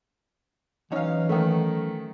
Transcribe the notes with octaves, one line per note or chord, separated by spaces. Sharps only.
E3 F#3 C#4 D#4 C#5 F5
D#3 A3